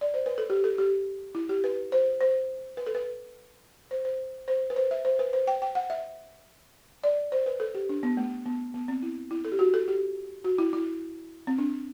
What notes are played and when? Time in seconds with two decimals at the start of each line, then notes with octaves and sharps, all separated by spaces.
0.01 D5
0.14 C5
0.26 B4
0.38 A4
0.50 G4
0.64 A4
0.78 G4
1.35 E4
1.49 G4
1.64 B4
1.92 C5
2.21 C5
2.77 B4
2.87 A4
2.95 B4
3.91 C5
4.05 C5
4.48 C5
4.70 B4
4.76 C5
4.91 E5
5.05 C5
5.19 B4
5.33 C5
5.47 G5
5.62 G5
5.75 F#5
5.90 E5
7.04 D5
7.32 C5
7.46 B4
7.60 A4
7.75 G4
7.89 D4
8.03 B3
8.17 A3
8.46 B3
8.74 B3
8.88 C4
9.03 E4
9.31 E4
9.45 A4
9.52 G4
9.59 F#4
9.74 A4
9.88 G4
10.44 F#4
10.58 E4
10.73 E4
11.47 C4
11.58 D4